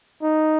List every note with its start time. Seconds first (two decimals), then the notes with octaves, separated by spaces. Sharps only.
0.22 D#4